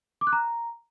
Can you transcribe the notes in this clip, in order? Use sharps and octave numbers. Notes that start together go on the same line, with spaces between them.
D6
F#6
A#5